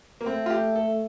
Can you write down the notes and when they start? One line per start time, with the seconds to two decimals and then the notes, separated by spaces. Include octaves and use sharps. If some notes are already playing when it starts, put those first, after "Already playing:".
0.21 A#3
0.26 A3 C4
0.46 F4
0.50 G4
0.76 A4